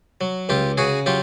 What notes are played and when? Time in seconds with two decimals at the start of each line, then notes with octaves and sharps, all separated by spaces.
0.21 F#3
0.49 C#2 F4 G4
0.78 C#3 F#4 G#4
1.06 F#3 F4 G4